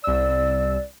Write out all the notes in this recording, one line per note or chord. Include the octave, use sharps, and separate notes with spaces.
C2 D5 E6